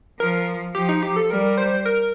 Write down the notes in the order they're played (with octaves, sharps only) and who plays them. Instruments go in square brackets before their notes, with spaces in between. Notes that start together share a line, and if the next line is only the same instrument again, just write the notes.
[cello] F3 [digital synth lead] A#4
[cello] F3 [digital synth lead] G4
[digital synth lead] D#4
G4
A4
[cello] G3 [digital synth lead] A#4
[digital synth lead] C5
A#4